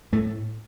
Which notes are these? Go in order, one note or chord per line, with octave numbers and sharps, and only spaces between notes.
A2 A3